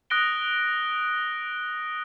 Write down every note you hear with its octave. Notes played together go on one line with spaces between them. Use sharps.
D#6 F#6 A#6 D7 G7